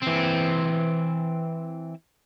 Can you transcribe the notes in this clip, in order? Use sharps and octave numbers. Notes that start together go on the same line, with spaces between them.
E3 C4